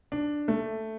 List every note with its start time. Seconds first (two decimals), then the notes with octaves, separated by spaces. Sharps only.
0.12 D4
0.48 A3